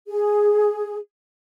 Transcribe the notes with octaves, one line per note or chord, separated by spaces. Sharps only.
G#4